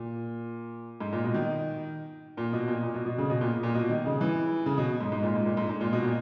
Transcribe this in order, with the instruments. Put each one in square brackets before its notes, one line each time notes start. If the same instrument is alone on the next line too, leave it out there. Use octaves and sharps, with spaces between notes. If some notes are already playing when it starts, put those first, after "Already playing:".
Already playing: [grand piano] A#2
G#2
A#2
B2
D#3
A#2
B2
A#2
A#2
B2
B2
C#3
B2
A#2
A#2
B2
D#3
C#3
E3
C#3
B2
G#2
G#2
A#2
G#2
A#2
G#2
G#2
A#2
B2
A#2